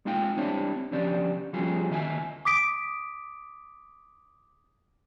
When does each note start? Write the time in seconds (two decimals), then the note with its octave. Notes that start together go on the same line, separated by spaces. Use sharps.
0.05 G#3 D#4 F4 F5 G5
0.37 G3 C4 D4 E4 C#5
0.91 C2 D3 F3 C#4 G4 D5
1.53 F3 G3 C#4 F4 F#4 G#4
1.90 D2 D#3 D#5 E5 G#5
2.45 D6 D#6 B6 D7